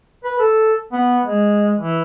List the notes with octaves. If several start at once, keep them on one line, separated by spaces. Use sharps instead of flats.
B4
A4
B3
G#3
E3